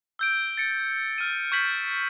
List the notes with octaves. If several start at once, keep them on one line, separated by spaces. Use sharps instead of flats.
E6 G6 D7
A6 C#7
F6 D#7
C#6 G6 G#6 B6 F#7